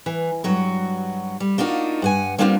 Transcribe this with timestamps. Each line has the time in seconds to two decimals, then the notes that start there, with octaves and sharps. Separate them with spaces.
0.06 E3
0.44 G2 F#3 F#4
1.40 G3
1.58 A#3 D4 D#4 F4 F#4
2.02 G2 F#5 G#5
2.38 G3 A#3 C4 D4 D#4 F4